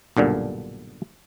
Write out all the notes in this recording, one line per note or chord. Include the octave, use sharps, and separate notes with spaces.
B1 G2 A#2 D3